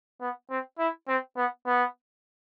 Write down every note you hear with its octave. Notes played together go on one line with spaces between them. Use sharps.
B3
C4
E4
C4
B3
B3